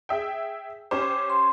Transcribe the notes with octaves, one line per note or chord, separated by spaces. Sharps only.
G#4 E5 G5
C#4 G4 C5 D6
C6